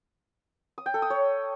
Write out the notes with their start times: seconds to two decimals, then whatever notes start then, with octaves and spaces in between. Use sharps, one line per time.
0.78 D#6
0.86 G5
0.94 A4
1.02 D#6
1.10 C#5